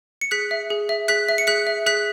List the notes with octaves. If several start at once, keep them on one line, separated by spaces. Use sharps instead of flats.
C#7
G#4 F#6 B6
E5
G#4
E5
G#4 F#6 B6
E5
C#7
G#4 F#6 B6
E5
G#4 F#6 B6